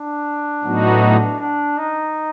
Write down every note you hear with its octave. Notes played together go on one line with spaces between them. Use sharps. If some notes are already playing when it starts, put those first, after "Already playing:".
Already playing: D4
A2 F#3 B3 D#4 F#4
D4
D#4